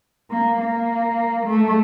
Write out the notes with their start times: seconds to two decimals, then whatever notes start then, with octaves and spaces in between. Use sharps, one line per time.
0.30 A#3
0.60 A#3
1.46 A3